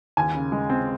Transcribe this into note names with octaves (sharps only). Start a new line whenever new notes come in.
D#2 G#5
C#3
G#3
C4